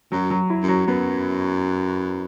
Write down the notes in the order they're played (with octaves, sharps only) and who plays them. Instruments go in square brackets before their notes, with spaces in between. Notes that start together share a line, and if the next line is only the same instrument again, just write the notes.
[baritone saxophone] F#2 [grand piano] F#3
[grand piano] F#3
E4
[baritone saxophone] F#2
[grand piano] F#3
[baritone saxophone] F#2 [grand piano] B3